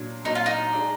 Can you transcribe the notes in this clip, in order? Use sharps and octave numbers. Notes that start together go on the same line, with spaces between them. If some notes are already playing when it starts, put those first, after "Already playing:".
Already playing: A#2 F#3 D4
A#2 F#3 D4 D#4
F4
D#4
G#3 D4 G#4 D5